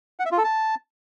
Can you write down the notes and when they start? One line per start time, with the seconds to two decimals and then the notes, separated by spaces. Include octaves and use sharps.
0.20 F#5
0.26 E5
0.32 F4
0.38 A4
0.44 A5